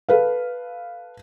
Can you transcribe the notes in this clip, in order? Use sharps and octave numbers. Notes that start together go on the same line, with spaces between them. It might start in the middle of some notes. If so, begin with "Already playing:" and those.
A4 B4 F5